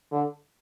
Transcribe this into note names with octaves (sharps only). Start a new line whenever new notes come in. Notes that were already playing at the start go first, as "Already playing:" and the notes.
D3